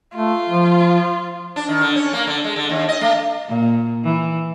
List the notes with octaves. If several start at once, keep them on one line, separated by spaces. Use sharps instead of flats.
A3 F4
F3
D4
D#3
D3
C#4
A#3
D3
G#3
D3
D#2
D#5
A3
A#2
E3